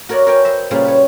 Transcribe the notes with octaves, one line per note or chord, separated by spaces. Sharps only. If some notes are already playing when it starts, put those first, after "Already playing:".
F#4 A#4 C#5 D5 F#5
A#4 B4 C#5 G5 G#5
C5 D#5 E5
A#2 C#3 G3 B4 C5 F5
B4 C#5